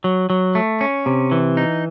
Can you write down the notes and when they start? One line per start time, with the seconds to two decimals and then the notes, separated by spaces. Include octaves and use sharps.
0.04 F#3
0.30 F#3
0.55 A3
0.81 C#4
1.06 C3
1.32 E3
1.57 D#4